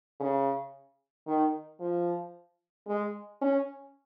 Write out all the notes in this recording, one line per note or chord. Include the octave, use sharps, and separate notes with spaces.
C#3
D#3
F3
G#3
C#4